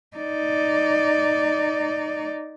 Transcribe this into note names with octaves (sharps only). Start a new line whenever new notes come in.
D#4 D5